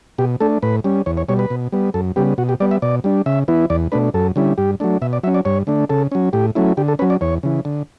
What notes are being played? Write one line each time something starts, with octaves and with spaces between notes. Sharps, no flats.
B2 G4
A3 D4 A4
A2 B4
G3 C#4
E2 C#5
C#5
B2 G3 C#5
B4
B2
G3 B3
F#2 A4
C#3 G3 B3 G4
B2 F#4
G4
G3 B3 D5
E5
B2 D5
G3 D4
C#3 E5
E3 B3 E4
E2 D5
B2 A3 D4 B4
F#2 A4
D3 G3 C#4 E4
G2 G4
F#3 A3 D4
B2 E5
D5
F#3 C#4 E5
D5
G2 C#5
D3 A3 D4
C#3 A4
F#3 C#4
A2 G4
F#3 A3 C#4 E4
D3 G4
A4
F#3 C#4 B4
D5
E2 C#5
C#3 E3
D3